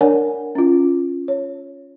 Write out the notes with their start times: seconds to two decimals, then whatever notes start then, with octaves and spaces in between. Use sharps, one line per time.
0.01 D4 A#4 C#5 D5 F#5 G#5
0.55 C#4 F4
1.28 C#5